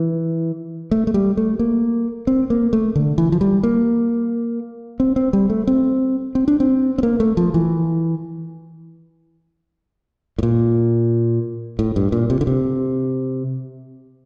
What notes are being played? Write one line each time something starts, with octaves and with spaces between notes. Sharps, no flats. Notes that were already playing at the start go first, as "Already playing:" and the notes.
Already playing: E3
A3
A3
G3
A3
A#3
C4
A#3
A3
D3
E3
F3
G3
A#3
C4
C4
G3
A3
C4
C4
D4
C4
C4
A#3
A3
F3
E3
A2
A#2
A2
G2
A#2
C3
D3
C3